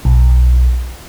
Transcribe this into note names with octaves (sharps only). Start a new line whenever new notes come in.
B1